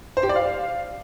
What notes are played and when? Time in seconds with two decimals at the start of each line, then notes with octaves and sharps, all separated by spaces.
0.17 C5
0.23 G4
0.29 D5
0.36 F5